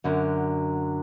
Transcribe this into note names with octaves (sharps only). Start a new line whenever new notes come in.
F#2 D3 F#3